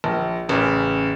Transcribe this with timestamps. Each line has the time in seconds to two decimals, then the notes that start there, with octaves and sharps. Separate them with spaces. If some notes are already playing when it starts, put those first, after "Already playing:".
0.04 A#1
0.49 A1 C#3